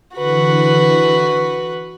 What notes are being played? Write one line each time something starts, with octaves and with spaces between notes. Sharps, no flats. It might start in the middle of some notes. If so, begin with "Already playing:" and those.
D3 E3 F#4 B4